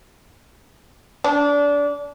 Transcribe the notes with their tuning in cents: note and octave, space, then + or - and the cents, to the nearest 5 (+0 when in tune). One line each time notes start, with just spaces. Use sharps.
D4 -25